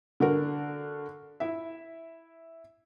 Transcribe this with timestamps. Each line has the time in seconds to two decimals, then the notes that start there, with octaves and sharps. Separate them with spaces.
0.20 D3 F#4 A#4
1.40 E4 E5